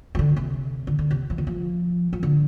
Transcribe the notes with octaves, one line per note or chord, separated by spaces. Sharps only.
F3
D3
C3
D3
D3
C3
F3
D3
F3
F3
D3